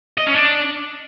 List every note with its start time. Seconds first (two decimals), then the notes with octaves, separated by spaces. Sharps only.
0.18 D#5
0.27 C#4
0.36 D4